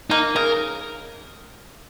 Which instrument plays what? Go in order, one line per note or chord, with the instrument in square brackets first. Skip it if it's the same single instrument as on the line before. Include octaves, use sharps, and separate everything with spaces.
[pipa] A#3 [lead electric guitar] D#4
[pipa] C#3 [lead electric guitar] A#4